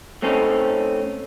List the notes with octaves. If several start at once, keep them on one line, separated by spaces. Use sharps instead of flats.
A3 C4 C#4 D#4 A4